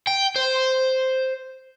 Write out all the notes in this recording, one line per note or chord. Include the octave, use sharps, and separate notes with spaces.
G5
C5